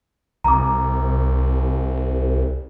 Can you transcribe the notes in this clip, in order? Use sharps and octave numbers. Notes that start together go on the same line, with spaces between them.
C2 A#5 D6